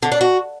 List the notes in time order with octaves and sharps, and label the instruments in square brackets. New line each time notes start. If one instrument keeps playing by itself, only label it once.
[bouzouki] D3
D4
F#4